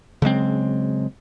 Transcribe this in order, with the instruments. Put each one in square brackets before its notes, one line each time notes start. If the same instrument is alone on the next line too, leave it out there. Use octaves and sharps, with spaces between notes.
[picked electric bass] C#3 F#3 G#3 C4